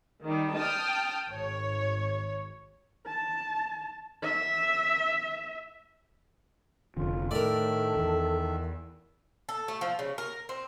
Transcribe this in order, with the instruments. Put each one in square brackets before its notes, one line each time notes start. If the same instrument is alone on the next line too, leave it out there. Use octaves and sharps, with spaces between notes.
[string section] D#3 G3
G5 A5 D#6 F6
G#1 C#5
[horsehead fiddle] A5
E5
[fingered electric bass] F1 F2 D3 [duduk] F4
[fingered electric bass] A2 [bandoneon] D#3 E5 [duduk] A4 [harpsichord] A#4 D5
[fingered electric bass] E2
[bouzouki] A4
A3
F3
C#3
A#4
C4